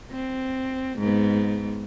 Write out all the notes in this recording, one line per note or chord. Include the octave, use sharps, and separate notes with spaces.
C4
G#2 B3